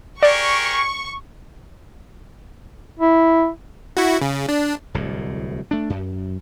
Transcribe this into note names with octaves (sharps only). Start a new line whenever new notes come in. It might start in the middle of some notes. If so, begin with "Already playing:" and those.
G4 G#4 A#4 D5 C#6
E4
E4 F#4
C#3
D4
D1 C2 A2
A3 D4
F#2